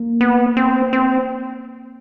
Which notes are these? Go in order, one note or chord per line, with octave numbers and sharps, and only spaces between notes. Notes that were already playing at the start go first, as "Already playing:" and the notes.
Already playing: A#3
B3
C4
C4